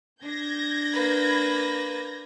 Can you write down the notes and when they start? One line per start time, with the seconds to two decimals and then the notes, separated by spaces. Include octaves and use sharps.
0.22 D4 G6 G#6 A#6
0.93 A#3 B4